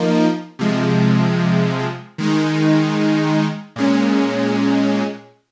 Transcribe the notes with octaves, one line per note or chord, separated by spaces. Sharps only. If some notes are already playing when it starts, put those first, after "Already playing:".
Already playing: F3 A#3 D#4
C3 F3 G#3
D#3 G#3 D#4
A#2 G#3 C#4